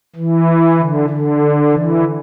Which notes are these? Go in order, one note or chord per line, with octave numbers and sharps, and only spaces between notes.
E3
D3
D3
E3